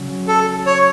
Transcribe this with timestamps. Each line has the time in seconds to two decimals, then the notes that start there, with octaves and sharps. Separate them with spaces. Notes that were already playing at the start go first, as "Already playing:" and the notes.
Already playing: C#3 F#3 C#4
0.28 A4
0.66 C#5